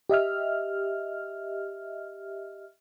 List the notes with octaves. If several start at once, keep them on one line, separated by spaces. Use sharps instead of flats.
G4 D#5 E5 F6